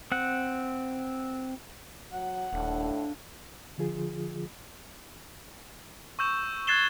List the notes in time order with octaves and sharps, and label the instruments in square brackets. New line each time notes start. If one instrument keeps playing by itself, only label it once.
[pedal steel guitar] C4 F#5
[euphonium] F#3 [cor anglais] F#5
[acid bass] D#1 [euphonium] A2 [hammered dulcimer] D3 D4 F5
[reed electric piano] D3 F3 F4 G#4
[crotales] C#6 E6 G6 E7
F#6 G#6 A6 C7 E7 G7